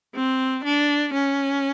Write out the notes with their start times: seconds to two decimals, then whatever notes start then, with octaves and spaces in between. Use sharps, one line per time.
0.15 C4
0.65 D4
1.13 C#4